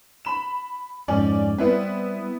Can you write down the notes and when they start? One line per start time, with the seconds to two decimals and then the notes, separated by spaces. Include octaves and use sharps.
0.25 B5 E7
1.08 F2 G#2 C#4 D5
1.58 G3 B3 C4 E4 B4